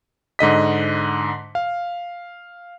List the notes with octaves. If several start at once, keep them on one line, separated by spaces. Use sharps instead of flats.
G#2 D3 D#5 B6
F5